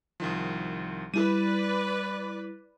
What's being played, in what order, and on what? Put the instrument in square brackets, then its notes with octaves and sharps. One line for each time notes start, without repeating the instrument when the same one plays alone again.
[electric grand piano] C2 D#3 F3
[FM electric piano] G3 E4 [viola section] B4 D5 [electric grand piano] D#7